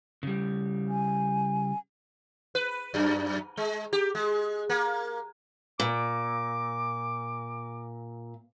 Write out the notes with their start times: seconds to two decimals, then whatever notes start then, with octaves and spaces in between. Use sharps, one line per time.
0.23 C#3 G3
0.89 G#5
2.55 B4
2.94 F#2
3.57 G#3
3.93 G4
4.15 G#3
4.70 A#3
5.80 A#2 D6